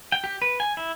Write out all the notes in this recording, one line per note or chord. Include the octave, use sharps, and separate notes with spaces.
G5
G4
B4
G#5
E4